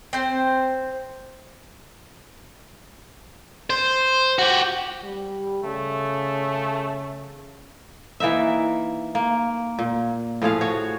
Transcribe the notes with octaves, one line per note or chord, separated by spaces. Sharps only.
C4 C5
C5
F#4 G4
G3
C#3 A3
E3 A#3 D#4 E5
A#3
A#2
A2 F3 G#4 F5
F#4 C#5